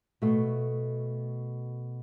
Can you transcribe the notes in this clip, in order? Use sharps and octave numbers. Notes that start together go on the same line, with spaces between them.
B2 A3